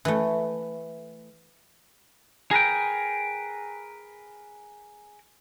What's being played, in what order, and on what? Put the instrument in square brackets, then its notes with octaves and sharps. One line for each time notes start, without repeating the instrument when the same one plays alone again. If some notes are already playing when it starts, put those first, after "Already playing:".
[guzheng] E3 A3
[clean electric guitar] G#4 A#4 B4 G5